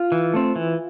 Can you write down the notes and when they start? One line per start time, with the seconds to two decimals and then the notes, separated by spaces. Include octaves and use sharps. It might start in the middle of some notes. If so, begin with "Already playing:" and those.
Already playing: F4
0.12 E3
0.34 A3 C4
0.56 E3